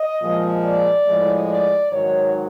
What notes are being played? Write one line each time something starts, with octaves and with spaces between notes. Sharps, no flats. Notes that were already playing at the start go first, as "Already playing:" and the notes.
Already playing: D#5
A#2 F3 G#3
D5
A2 F3 G#3
D5
G#2 D#3 F#3 C#5